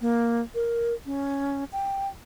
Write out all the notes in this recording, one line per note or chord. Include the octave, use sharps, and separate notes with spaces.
A#3
A#4
C#4
G5